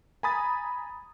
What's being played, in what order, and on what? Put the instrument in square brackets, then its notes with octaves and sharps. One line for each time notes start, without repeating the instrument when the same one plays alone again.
[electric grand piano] G#5 A#5 B5 D#6 A6